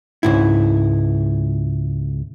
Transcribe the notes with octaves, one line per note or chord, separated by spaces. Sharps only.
C#2 G#2 E4